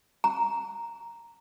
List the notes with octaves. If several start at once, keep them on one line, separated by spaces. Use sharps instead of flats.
A#5